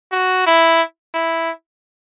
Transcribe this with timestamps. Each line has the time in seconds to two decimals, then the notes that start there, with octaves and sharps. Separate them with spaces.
0.12 F#4
0.46 E4
1.15 E4